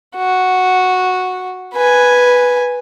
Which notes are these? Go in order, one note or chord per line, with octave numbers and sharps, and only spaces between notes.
F#4
B4 G#5